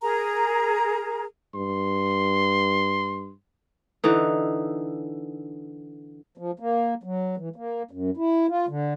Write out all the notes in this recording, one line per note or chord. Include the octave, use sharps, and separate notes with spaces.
G#4 A#4 A#5
G2 C6
D3 E3 D#4
F3
A#3
F#3
E3
A#3
F#2
E4
F4
D3